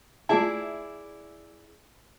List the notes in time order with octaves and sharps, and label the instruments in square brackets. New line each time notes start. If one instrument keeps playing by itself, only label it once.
[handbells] A3 F4 A5 [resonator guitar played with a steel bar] E4 G#4 D5